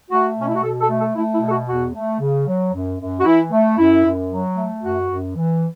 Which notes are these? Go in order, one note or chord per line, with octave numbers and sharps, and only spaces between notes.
A3 F#4
B2 C#4
E4
F#4
B2 A4
A4
A3
A4
A3 E4
E4
B2
A4
F#4
E2 F#4
A3
C#3
F#3
F#2
F#2
F#4
E3 E4
A3
F#2 E4
F#2
F#3
A3
F#2 F#4
F#2
E3